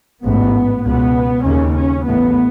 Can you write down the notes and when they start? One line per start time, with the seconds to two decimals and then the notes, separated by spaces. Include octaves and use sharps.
0.24 A1 G#2 B3
0.85 C#2 B2 B3
1.45 D#2 C#3 C#4
1.75 C#4
2.06 A1 A2 B3